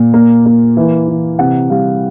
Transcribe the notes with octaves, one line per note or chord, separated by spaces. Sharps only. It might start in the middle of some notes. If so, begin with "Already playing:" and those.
Already playing: A#2
A#3
A#3
E3
E3
C3 F#5
G3 F5